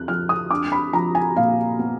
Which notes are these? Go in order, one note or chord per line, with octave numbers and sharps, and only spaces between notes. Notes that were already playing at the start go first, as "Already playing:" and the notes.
Already playing: F2 F#6
F3 F6
D#6
D4 D6
B5
F3 A#5
G#5
A#2 F5
B3